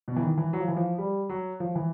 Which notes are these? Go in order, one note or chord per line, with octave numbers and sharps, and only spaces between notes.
B2
E3
D#3
E3
F#3
F3
E3
F3
G3
F#3
F3
E3